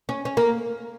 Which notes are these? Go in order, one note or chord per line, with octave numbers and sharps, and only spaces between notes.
C#4
C#4
A#3